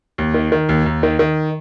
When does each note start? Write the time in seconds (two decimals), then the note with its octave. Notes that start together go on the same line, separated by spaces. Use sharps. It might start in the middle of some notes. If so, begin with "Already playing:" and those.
0.18 D#2
0.34 D#3
0.52 D#3
0.69 D#2
0.86 D#2
1.03 D#3
1.19 D#3